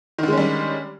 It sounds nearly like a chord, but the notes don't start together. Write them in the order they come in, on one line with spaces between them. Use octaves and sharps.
D#3 D3 G#3 C#4 G3